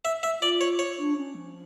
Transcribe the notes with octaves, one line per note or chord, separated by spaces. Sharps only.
E5
E5
F4 D5
C#5
C#5
D4
C#4
F3